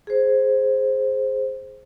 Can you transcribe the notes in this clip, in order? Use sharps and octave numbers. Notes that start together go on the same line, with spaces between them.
G#4 C5